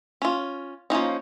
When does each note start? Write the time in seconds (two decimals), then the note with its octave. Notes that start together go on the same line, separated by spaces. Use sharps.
0.22 C#4 F4
0.90 F3 A#3 C#4 D#4